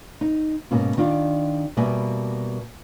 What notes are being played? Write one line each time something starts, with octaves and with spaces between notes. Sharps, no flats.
D#4
G#2 B2 A#3 C#4
D#3 D4 F4
B2 G3 A#3 E5 G#5